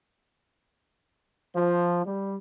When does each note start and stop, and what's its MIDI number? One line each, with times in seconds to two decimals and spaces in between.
1.55 2.04 53
2.05 2.36 55